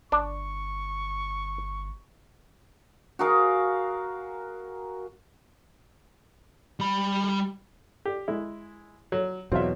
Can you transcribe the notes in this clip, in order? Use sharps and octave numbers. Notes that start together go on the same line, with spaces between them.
G1 D4 C#6
F#4 G#4 A#4 F5
G3 B5
G4
G#3 E4
F#3
E2 B2 F#3 C4 F4 E5